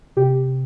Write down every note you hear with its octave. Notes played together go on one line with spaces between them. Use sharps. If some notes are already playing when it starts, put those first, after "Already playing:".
C3 G4